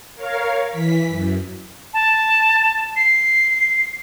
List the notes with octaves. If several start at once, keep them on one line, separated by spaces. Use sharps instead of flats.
A#4 C#5 F5
E3 B6
F#2
A5
C7